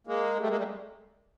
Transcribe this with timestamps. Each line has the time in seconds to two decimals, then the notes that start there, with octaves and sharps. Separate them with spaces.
0.07 G#3 A#3
0.41 G3 A3
0.49 G#3 A#3
0.58 G3 A3